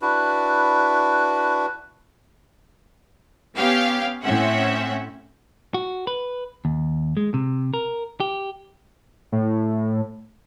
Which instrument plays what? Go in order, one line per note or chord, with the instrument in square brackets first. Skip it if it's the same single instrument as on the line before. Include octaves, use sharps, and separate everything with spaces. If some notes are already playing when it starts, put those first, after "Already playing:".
[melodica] D4 E4 F#4 B4
[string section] B3 C#4 G4 F5
A2 C4 C#4 E5 F#5
[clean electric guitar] F#4
B4
D#2
G#3
C3
A#4
G4
[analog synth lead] A2